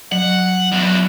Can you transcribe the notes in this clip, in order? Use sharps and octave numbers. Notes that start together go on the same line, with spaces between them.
F#3 F#5
E2 F#3 D4